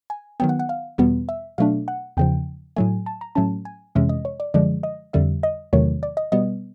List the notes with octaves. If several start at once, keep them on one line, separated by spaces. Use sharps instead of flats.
G#5
D#3 F#3 B3 G5
F#5
F#5
F5
E2 B2 G3 B3
E5
B2 F#3 A3 D4 F5
F#5
E2 C#3 F3 G5
A2 F#3 A3 G#5
A5
A#5
A2 F#3 A3 C#4 A5
G#5
F2 C3 E3 G#3 C#4 E5
D#5
C#5
D5
F#2 D3 F3 G#3 D5
D#5
F2 D3 G3 E5
D#5
E2 C3 D#3 F#3 A3 C#5
D5
D#5
B2 G3 B3 D#5